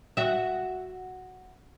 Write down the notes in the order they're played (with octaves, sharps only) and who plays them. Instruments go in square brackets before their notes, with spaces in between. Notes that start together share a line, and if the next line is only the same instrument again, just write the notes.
[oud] F#4 E5